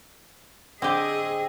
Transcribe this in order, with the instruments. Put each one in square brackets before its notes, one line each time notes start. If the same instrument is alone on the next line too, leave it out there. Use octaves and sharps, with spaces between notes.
[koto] D3 G4 [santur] C4 [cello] G#4 [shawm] D#5